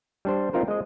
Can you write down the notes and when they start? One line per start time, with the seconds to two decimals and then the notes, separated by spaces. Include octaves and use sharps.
0.25 G3 D4 C5
0.53 C4 D#4 F4 A#4 C5
0.68 G#3 D#5